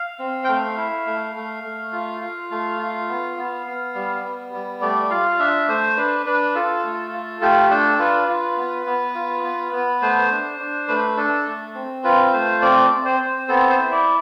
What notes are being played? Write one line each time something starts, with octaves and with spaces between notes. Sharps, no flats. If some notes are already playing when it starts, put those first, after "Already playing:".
Already playing: F5
C4
G5
A3 F5
E4
A3
A3
A3
F4
F4
A3
F4
B3
B3
B3
G3
B3
G3
A3 D5
F4 F5
D4 E5
A3 C5
D4 B4
D4 B4
F4 A4
A3
F4
A3 G4
D4 A4
F4 B4
F4
B3
B3
F4
B3
B3
A3 C5
D4
D4
A3 B4
D4 A4
A3
C4
F4 B4
A3 C5
C4 D5
C4
C5
C4
B3 A4
C5
E4
D5